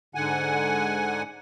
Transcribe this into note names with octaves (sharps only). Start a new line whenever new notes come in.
G#2 D3 F#5 G#5